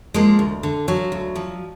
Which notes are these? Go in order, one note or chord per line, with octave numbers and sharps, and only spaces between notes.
F3 G#3 A#3
D2
D3
F3 F#3
D2
F3